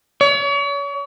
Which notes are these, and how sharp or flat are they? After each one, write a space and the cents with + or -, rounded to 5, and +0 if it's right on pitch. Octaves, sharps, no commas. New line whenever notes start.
C#5 +40